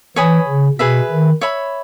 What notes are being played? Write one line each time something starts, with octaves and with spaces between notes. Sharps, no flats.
E3 C#5 G#5 B5 D#6
C#3
B2 G#4 B4 E5
D#3
C#5 E5 B5